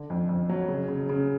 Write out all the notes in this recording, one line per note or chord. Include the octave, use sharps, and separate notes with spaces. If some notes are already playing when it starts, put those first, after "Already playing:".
Already playing: D3
F2
F2
F#3
C#3
C#3
C#3